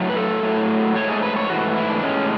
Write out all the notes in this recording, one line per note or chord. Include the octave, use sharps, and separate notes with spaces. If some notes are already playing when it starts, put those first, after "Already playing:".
Already playing: A2 F#3 A3
B4
A4
A2 F#3 A3
G#2 E3 A3 C#5
G#4
B4
C#5
G#2 E3 A3 F#4
E4
D4
A2 G#3 C#4